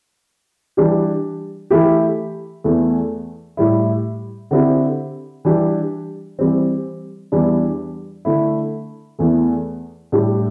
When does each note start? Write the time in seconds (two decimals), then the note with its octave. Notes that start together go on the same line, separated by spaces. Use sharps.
0.77 E3 G3 D4 G4
1.70 E3 A3 E4 G4
2.64 E2 E3 A3
3.57 A2 G3 E4
4.51 D3 C4 E4 G4
5.45 E3 G3 D4 G4
6.39 E3 G3 C4
7.32 E2 E3 G3 D4
8.25 D3 A3 E4
9.19 E2 E3 A3
10.12 A2 G3 D4 G4